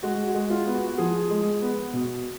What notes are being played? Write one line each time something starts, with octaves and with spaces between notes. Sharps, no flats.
G#3 F#4
F#4
G#3
F4
B3
F#4
F3 G#4
G#3
B3
B2